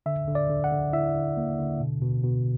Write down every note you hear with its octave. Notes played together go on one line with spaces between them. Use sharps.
D3 E5
D3
D5
D3
F#5
D3
E4 E5
D3
A#3
D3
B2
B2
B2